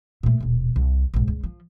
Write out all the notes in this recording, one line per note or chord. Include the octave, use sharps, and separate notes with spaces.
A#2 A3
D#1 B2
C2
A#1 G#2
C#2
F3